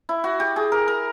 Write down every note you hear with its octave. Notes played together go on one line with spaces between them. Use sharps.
E4
F#4
G4
G#4
A#4
A#4